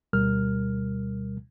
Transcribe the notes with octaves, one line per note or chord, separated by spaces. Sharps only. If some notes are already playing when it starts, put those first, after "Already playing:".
D2 B2 G3 A#4 F6